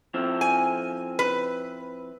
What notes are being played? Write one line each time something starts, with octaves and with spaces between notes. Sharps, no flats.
F3 C4 E4
G#5
B4